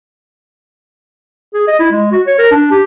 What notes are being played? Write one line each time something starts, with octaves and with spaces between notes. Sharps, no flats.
G#4
D#5
E4
G#3
F#4
C#5
A#4
D4
G4